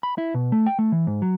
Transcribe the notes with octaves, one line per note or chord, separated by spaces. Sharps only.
B5
E4
B2
A3
G5
A3
E3
G#2
F#3